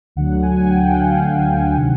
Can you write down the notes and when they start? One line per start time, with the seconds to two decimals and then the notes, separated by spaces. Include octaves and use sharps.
0.16 D2 D3 F#3 F#5
0.43 G#5
0.65 F#5
0.69 G5
0.90 F5
0.95 F#5
1.77 C3 D#3